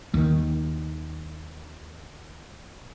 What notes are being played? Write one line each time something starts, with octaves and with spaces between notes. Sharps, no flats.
D#2 D#3